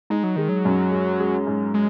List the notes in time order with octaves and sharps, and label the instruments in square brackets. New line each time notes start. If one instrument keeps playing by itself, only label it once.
[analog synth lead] G#3 [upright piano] D#4
[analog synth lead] F#3
[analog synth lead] D#3 [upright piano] G#3
[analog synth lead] F#3
[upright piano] F#2
G#3
G#3
G#2
[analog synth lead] G#3